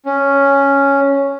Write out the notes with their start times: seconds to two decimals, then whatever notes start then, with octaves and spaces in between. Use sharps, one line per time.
0.06 C#4